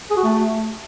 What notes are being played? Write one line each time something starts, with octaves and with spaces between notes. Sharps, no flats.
G#4
F#4
A3